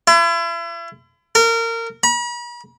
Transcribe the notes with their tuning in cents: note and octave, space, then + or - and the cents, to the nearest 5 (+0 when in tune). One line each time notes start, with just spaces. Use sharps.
E4 +40
A#4 -25
B5 -45